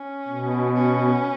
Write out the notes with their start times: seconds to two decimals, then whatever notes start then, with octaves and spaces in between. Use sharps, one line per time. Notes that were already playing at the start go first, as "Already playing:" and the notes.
Already playing: C#4
0.28 B2
0.74 C#4